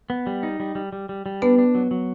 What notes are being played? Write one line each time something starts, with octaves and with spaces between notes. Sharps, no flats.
B3
G3
D#4
G3
G3
G3
G3
G3
B3 D4 B4
D4
F#3
F#3